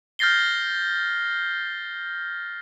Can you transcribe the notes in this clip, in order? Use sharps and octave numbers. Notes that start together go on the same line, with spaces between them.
F6 G6 A6 A#6 C7 G7